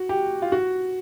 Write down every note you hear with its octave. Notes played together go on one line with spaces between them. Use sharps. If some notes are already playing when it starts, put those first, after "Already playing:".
Already playing: F#4
G4
F4
F#4